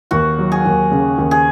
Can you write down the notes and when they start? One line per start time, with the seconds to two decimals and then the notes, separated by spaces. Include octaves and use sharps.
0.11 D#2 F#4
0.38 F#3
0.52 G#4
0.65 D#2
0.92 C#3
1.18 D#2
1.31 G#4